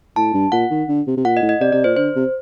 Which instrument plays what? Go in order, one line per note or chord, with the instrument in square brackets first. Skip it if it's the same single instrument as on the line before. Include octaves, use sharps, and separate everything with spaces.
[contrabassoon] A2 [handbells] A5
[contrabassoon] G2
[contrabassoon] A#2 [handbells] F#5
[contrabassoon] D#3
D3
C3
C3
[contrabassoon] A#2 [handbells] F#5
[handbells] D#5
[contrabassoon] A2
[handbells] D#5
[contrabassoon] C3 [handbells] D5
[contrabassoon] C3 [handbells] D5
[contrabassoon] A#2 [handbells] C5
[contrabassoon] D3 [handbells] C5
[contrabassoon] C3